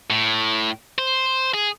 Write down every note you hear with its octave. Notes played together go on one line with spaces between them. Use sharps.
A2
C5
G#4